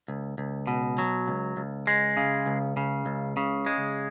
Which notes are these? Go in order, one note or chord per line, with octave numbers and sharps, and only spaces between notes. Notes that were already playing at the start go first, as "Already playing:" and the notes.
C#2
C#2
B2
F#3
C#2
C#2
G#3
C#3
C#2
C#3
C#2
C#3
G#3